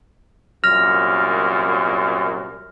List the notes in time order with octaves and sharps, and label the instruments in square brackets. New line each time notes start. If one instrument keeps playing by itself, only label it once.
[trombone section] C2 F#2 A#2 [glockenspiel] F6 A#6 F7